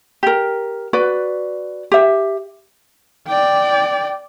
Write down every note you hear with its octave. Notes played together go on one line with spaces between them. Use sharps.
G4 A#4
F#4 B4 D5
G4 E5
D5 G5